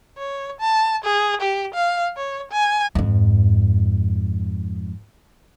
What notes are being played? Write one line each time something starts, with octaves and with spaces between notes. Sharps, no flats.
C#5
A5
G#4
G4
F5
C#5
G#5
F2 G#2